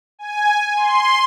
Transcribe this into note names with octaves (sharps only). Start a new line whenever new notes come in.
G#5
C6